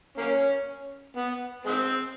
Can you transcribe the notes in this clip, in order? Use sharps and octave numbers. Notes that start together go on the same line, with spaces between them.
A#3 C#4
B3
G#3 C4